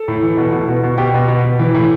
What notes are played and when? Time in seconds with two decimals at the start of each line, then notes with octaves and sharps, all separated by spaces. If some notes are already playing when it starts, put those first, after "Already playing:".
Already playing: A4
0.08 A2
0.23 E3
0.37 B2
0.52 B2
0.68 B2
0.83 B2
0.98 B2 G4
1.14 B2
1.28 B2
1.44 B2
1.59 E3
1.75 A2